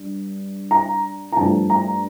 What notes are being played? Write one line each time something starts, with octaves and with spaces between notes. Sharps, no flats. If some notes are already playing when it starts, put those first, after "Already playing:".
Already playing: G2
A#5
A#5
G2 F3 A3 A5
A#5